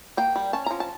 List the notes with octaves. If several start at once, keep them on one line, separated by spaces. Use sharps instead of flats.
A#3 G5
G3
C#4 A5
F3 A#5
A5